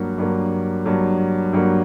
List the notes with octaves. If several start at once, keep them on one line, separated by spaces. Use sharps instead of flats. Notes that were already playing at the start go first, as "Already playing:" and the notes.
Already playing: G2 F#3 A#3
G2 F#3 A#3
G2 F#3 A#3
G2 F#3 A#3